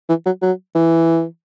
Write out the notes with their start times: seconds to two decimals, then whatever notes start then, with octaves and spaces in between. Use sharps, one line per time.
0.09 E3
0.26 F#3
0.42 F#3
0.75 E3